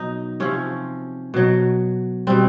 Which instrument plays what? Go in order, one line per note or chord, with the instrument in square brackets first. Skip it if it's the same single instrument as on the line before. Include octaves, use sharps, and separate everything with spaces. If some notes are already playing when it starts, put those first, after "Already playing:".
Already playing: [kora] B2 F#3 D#4
C3 F3 C#4
B2 F#3
B2 G3 C4